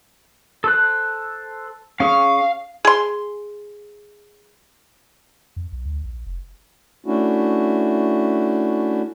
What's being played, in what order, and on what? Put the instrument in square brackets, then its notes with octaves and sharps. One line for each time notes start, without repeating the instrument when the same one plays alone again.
[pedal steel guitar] A4 C5 F#6
[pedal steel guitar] C#4 G#4 C#6 [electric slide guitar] F5
[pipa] G#4 C6
[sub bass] F2
B1
D2
A#1
F1
[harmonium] A3 C#4 D4 E4 F#4